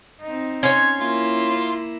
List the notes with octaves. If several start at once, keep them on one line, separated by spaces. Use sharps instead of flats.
C4 D#4
C#4 C#5 C6
A#3 E4 F4